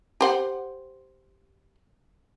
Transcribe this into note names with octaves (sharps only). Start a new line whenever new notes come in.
G4 C5 F#5